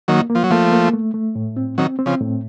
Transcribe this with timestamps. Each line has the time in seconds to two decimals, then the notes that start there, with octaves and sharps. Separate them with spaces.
0.08 D#3 F#3 A#3
0.30 A#3
0.35 F3
0.44 F#3
0.51 F3 A3 A#3
0.72 A#3
0.93 A3
1.14 A3
1.36 A2
1.57 C4
1.78 D#3 F#3 C4
1.99 C4
2.06 C#3 F3
2.20 A2